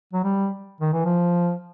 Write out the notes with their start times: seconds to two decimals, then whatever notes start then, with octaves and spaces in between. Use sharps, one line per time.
0.13 F#3
0.24 G3
0.81 D#3
0.93 E3
1.05 F3